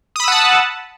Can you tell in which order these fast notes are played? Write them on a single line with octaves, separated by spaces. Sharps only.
D#6 B5 E6 F#5 A5